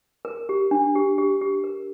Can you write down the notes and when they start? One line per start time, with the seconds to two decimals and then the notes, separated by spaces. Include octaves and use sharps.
0.25 A#4
0.49 G4
0.71 D4
0.95 G4
1.18 G4
1.41 G4
1.64 A#4